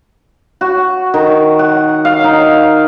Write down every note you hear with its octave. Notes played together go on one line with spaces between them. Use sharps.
F#4
D#3
F#5
F5
D#4